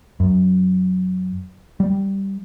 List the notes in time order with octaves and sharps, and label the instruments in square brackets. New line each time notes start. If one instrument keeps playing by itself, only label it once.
[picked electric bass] F#2
G3